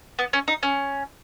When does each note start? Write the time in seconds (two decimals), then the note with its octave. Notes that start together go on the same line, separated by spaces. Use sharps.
0.19 B3
0.33 C#4
0.48 D#4
0.63 C#4